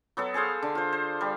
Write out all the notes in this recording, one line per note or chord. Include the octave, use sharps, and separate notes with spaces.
F#3 B3 A4
G#4 A4 C5 F5
D3
F4 C5
C5
G3